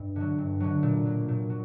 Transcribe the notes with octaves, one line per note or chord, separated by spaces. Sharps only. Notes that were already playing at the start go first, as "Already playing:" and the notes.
Already playing: G2
D3 F#3
G2
D3 F#3
A#2
F#3 A#3
A#2
F#3